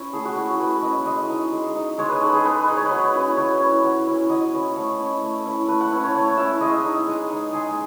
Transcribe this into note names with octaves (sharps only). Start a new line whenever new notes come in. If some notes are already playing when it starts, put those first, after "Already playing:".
Already playing: C#4 E4
A3 G#4
F#4
C#4 E4 F#4
A3 B4
C#4 E4 D#5
G#3 D#5
D#4
G#3
D#4
G#3 C#5
B4
D#4 A4
G#4
G#3 B4
D#4 B4
C#5
F#3 B4
C#4 E4
F#3 C#5
C#4 E4
F#3
C#4 E4
F#3 D#5
C#4 E4
A3 C#5
C#4 E4
A3
C#4 E4
A3 B4
F#5
C#4 E4
C#5
A3 C#5
C#4 E4 E5
G#3 D#5
D#4
G#3
D#4
G#3 G#4